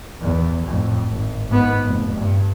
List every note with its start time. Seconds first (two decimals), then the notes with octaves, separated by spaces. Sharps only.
0.21 E2
0.67 F2 A2
1.09 G#1
1.48 G#2 B3
1.83 F1
2.19 G2